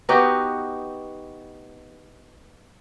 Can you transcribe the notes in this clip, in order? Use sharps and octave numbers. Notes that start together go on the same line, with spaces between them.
B3 D#4 F#4 G4